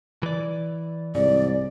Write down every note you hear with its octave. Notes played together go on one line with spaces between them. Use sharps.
E3 D5
C2 G#2 D5